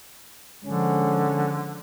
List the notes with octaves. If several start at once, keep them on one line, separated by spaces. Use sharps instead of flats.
D3 F3 G#3 C#4